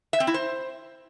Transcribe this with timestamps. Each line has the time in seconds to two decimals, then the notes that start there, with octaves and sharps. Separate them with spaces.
0.13 E5
0.20 C4
0.27 E4
0.34 C5